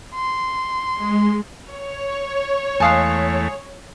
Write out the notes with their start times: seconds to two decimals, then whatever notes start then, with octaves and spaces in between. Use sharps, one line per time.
0.15 C6
0.95 G#3
1.72 C#5
2.80 E2 G#3 A3 F5 G#5 A5 D#6 C7